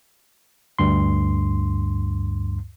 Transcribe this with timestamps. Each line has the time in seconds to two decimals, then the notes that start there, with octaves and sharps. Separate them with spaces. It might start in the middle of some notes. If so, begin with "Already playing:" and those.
0.79 D2 G2 C6